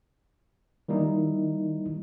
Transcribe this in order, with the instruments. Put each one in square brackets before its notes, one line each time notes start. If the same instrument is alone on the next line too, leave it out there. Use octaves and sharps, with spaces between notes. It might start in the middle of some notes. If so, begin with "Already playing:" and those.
[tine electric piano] D#3 G3 A#3 D#4 E4